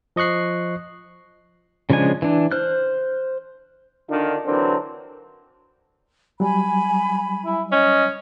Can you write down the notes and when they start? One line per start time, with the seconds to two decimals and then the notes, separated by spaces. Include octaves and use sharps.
0.16 F3 D#5 C#6 F#6 C7
1.90 C#3 F3 G#3 D4 G#5
2.22 E3 D4
2.51 C5 F6 F#6
4.09 D3 D#3 D4 D#4 F4
4.44 D3 E3 F#3 C4 D4 A#4
6.40 F#3 G3 G#5 B5
7.45 E4
7.72 C#4 D#5